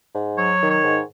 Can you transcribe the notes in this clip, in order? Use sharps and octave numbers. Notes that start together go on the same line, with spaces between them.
G#2
F#3 C#5
D#3
C#5
G#2